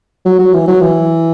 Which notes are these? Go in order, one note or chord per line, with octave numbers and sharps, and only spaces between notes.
F#3
F#3
E3
F#3
E3